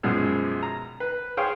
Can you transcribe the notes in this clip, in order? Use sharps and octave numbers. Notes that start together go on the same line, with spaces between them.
F#2 B2 F3 G#3 F6
A#5
B4
G#4 C5 C#5 F5 G5